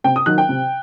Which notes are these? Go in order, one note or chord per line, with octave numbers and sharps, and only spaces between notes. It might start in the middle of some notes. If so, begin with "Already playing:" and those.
C3 G5
D#6
D#3 F#3 F#6
G5
C3